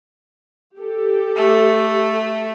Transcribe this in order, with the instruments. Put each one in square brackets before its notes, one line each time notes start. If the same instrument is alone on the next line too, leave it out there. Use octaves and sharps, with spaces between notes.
[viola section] G4 A4
[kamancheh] A3